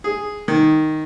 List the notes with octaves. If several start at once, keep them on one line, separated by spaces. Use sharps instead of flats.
G#4
D#3